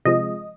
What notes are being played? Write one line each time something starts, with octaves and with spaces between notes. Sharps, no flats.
C3 F3 G#3 D#5